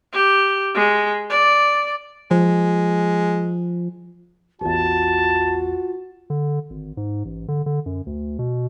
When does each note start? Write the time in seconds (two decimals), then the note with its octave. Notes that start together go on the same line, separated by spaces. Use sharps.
0.13 G4
0.75 G#3
1.30 D5
2.31 F3 G#3
4.61 A1 E2 F4 F#4 A5
6.30 D3
6.70 G#1
6.97 G#2
7.25 A1
7.48 D3
7.66 D3
7.86 F#2
8.06 D2
8.39 B2